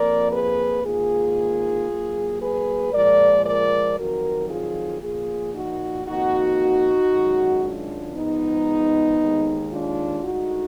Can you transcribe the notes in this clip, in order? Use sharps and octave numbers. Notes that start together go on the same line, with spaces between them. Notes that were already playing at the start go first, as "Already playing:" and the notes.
Already playing: F2 F3 A#3 A#4 D5
G#4 B4
G#2 D#3 A#3 F4 G#4
G#2 F#3 A#3
G#4 B4
A#2 F3 G#3 A#4 D5
A#4 D5
F2 D#3 F#3 F#4 A#4
F4 G#4
A#2 F3 A#3 F4 G#4
D#4 F#4
F2 D#3 A#3 D#4 F#4
F#2 D#3 G#3
D4 F4
G#2 F3 G#3 B3 D#4
D#2 D#3 G#3
D4 F4
D2 D3 G#3 D#4 F#4